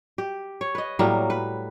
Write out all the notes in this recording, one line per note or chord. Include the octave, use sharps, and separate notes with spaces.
G4
C#5
B4 D#5
A2 F#3 G3 A#3
B4